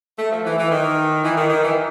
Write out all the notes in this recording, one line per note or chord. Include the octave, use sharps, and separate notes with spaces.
A3
F3
E3
E3
D#3
E3
D#3
D#3
E3